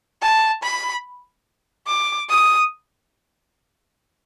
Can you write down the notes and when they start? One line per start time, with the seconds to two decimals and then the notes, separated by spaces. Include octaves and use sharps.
0.22 A5
0.63 B5
1.87 D6
2.30 D#6